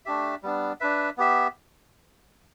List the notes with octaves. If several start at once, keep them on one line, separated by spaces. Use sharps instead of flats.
A3 D4 G4 E5
G3 B3 D4
D4 B4 E5
B3 G4 E5